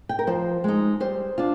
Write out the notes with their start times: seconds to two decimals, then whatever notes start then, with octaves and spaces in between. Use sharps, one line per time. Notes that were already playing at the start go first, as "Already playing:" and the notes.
0.09 G5
0.19 A#4
0.27 F3 C5
0.64 G#3 D#4
1.00 G3 C5
1.38 D4 F4